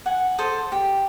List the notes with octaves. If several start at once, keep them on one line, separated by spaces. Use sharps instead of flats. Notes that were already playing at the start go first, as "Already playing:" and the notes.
F#5 G#5
A4 C5 D#6
G4